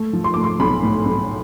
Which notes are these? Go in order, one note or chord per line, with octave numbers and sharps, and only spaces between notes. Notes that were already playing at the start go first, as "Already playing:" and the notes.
Already playing: A3
F3
C6
A3 D6
C6
B1 B5
A2
B1